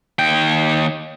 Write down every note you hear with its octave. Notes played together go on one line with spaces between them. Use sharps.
D#2 G5